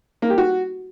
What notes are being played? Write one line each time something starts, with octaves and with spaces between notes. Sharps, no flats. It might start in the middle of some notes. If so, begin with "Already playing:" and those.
A#3
G4
F#4